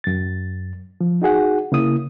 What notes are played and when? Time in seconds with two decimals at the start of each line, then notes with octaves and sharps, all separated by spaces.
0.04 F#2 A6
1.01 F3
1.22 D#4 F#4 G#4 F#5
1.72 C#3 A#3 E4 D#6